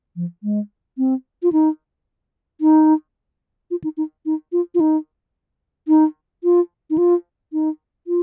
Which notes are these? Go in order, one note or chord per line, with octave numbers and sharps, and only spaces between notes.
F3
G#3
C4
F4
D#4
D#4
F4
D#4
D#4
D#4
F4
F4
D#4
D#4
F4
D#4
F4
D#4
F4